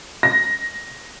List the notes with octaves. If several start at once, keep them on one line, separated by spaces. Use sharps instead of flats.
A#6